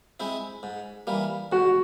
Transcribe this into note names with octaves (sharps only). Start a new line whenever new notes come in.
G#3 C4 E4
G#2
E3 G3 A#3
G#2 F#4